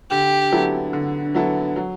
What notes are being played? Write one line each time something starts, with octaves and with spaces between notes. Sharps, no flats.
D3 G4
F#3 B3 E4 A4
D3
F#3 B3 E4 A4
F#3